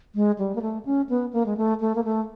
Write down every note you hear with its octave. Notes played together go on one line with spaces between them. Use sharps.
G#3
G3
A#3
A3
C#4
B3
A#3
G#3
A3
A3
A#3
A3